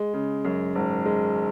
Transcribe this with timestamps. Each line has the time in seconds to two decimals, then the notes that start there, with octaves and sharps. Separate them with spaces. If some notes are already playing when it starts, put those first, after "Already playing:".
Already playing: G#3
0.14 C#3
0.45 F#2
0.75 G#1
1.05 G#3